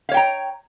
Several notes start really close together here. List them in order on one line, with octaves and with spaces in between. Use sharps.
F5 C#5 G5 A#5